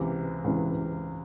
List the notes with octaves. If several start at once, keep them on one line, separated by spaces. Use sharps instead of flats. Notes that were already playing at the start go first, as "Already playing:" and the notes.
Already playing: C#2 C3 E3
C#2 C3 E3